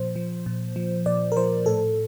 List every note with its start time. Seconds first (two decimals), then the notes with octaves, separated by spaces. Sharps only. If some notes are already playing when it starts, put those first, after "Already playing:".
Already playing: A#2 F3 C5
0.16 F3
0.46 A#2
0.76 F3
1.06 A#2 D5
1.32 A#4
1.36 F3 C5
1.66 A2 A4